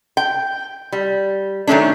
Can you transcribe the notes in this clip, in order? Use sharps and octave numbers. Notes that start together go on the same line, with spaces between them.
G5
G3
D#3 F#3 A3 C#4 D4